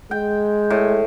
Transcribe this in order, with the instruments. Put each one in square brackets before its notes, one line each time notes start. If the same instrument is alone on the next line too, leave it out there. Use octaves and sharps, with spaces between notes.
[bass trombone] G#3 [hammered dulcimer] G5
[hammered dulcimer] A2